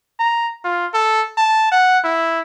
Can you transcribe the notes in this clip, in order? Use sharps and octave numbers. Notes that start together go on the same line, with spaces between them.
A#5
F4
A4
A5
F#5
E4